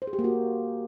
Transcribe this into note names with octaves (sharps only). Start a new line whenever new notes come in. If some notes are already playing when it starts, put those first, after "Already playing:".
C5
G#4
G4
A#3
F#4